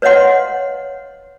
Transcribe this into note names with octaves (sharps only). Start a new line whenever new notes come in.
B4 C#5 D#5 F5 F#5 C6